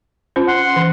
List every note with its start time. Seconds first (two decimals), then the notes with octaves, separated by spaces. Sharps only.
0.36 C#4 F4 C5
0.48 F#5 C6
0.76 E3